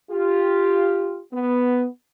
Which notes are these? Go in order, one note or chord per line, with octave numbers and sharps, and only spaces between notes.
F4 G4
B3